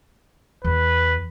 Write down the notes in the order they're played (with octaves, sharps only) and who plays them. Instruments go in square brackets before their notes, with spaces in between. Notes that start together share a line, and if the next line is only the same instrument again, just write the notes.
[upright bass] E2 [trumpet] B4